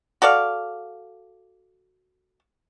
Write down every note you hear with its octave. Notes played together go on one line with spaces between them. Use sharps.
F#4 A4 D5 F5